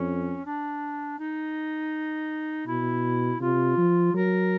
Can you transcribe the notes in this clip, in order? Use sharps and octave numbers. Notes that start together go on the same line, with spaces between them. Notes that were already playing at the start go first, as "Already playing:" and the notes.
Already playing: F2 C#4
D4
D#4
B2 E4
C3 F4
F3
F#3 A#4